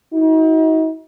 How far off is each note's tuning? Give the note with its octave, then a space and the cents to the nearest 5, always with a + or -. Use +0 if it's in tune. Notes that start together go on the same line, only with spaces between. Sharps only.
D#4 +40 F#4 +0